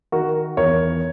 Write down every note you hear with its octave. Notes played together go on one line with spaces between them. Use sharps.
D#3 F#4 A#4
E2 A#4 C#5